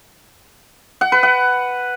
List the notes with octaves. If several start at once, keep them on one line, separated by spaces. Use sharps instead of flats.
F#5
B4
F#5